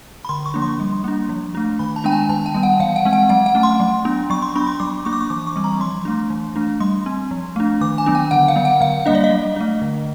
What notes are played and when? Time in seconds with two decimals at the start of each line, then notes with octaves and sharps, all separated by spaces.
0.25 B5
0.29 D3 C6
0.46 C#6
0.54 F3 A#3 D4
0.62 C6
0.80 G3
1.04 A#3 D4
1.29 F3
1.55 A3 D4
1.79 D#3 B5
1.96 A5
2.04 G#3 B3 D4 G5
2.12 G#5
2.29 D#3 A5
2.46 G5
2.54 G3 B3
2.63 F#5
2.80 E3 F5
2.96 F#5
3.05 G#3 C4
3.13 F#5
3.29 F#3 F#5
3.46 F#5
3.55 A3 C#4
3.63 C6
3.80 F#3
4.05 B3 D4
4.30 F#3 C#6
4.42 C6
4.55 B3 D4 B5
4.67 C6
4.80 F#3 D6
5.05 A#3 D4 C#6
5.13 D6
5.21 C#6
5.30 E3 D6
5.47 C#6
5.56 G3 C4
5.64 A#5
5.80 F3 C6
6.05 A3 D4
6.30 E3
6.56 A3 D4
6.80 G3 C6
7.06 C4
7.31 F3
7.56 A3 D4
7.81 D#3 D6
7.98 G#5
8.06 F#3 B3 D4
8.15 G5
8.31 D3 F#5
8.48 F5
8.56 F#3 B3
8.65 F#5
8.81 D3 F5
9.06 G3 A#3 D4 D#5
9.15 D5
9.24 D#5
9.31 F#3
9.56 A3 D4
9.82 D3